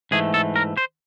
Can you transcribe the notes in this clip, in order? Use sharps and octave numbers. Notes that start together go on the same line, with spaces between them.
G#2 E3 A3 G#4
A4
A#4
C5